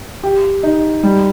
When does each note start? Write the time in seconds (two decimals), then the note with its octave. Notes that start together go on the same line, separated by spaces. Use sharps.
0.23 G4
0.63 D#4
1.03 G3